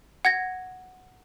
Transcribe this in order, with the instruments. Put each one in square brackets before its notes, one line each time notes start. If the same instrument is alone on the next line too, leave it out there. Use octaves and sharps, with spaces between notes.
[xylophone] F#5 G#6 A#6